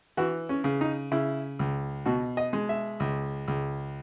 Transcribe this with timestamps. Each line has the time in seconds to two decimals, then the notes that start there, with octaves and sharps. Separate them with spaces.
0.17 E3 F#4
0.49 C#4
0.64 C#3
0.81 D#4
1.12 C#3 E4
1.59 C#2
2.06 B2 F#4
2.37 D#5
2.53 G#3
2.69 E5
3.00 C#2
3.48 C#2